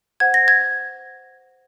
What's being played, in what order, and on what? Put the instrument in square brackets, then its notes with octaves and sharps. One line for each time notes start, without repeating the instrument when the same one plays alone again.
[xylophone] C5 F#5 G#6
A#6
G#6